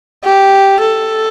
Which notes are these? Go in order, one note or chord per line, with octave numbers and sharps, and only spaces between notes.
G4
A4